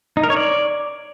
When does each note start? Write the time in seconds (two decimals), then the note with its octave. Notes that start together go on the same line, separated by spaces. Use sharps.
0.17 D#4
0.23 A#4
0.30 C#5
0.37 D5